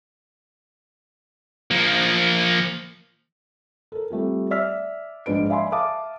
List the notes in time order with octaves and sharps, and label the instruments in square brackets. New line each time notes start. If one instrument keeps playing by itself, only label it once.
[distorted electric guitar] F3 A#3
[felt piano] A4 A#4
G3 A3 C4 F4
D5 E5 E6 F6 B6
A#1 G#2 D4 B4 D7
D5 E5 F5 G#5 B5 C6
E5 F5 A5 D6 D#6